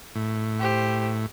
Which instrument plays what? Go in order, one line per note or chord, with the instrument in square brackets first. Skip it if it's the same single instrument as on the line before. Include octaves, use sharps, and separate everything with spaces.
[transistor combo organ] A2
[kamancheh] G4 C5